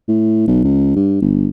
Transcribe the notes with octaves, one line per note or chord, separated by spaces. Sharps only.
A2
B1
C#2
G2
G1